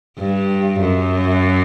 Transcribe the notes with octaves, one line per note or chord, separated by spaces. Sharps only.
G2
F#2